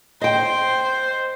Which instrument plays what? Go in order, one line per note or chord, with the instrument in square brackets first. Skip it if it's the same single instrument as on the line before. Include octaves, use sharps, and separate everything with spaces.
[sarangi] C5 [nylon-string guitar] D#5 G5